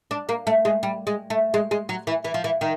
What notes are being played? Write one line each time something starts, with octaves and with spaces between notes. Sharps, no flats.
D4
A#3
A3
G#3
G3
G#3
A3
G#3
G#3
F#3
E3
E3
F3
E3
D#3